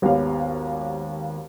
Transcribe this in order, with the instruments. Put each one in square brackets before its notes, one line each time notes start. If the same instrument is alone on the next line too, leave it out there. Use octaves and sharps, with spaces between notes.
[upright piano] G#1 D#2 B3 G4 C#5 F5